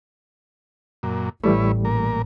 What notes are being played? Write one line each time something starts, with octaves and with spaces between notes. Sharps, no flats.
F#2 A#2
A1 E3 G3 A3 E4 B4 C#5
A#2 A#4